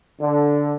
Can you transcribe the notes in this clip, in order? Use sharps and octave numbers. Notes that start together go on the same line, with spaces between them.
D3